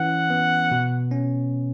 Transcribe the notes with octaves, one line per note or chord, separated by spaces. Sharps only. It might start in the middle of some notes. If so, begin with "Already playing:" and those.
Already playing: E3 C#4 F#5
B3
B2
C#4